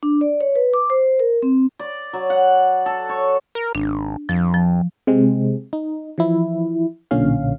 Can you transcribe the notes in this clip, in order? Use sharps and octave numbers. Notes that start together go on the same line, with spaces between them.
D4
D5
C#5
B4
D6
C5
A#4
C4
D5
F#3
F#5
A4
C#5
A#4
G#1 D4
F2 F3
F3
C3 G#3 C4
D#4
E3 F3 E4
B1 A#2 D3 C#4 F5